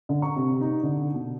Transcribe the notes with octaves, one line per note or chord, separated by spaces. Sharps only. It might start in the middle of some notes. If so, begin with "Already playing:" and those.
D3
C#6
C3
D#4
D3
B2